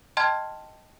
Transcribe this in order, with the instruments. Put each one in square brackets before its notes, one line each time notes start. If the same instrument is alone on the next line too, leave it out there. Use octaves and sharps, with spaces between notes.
[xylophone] D#5 G5 A5 C6 F6 G#6